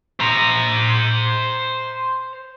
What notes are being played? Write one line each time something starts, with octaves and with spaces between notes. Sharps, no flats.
C5 A#5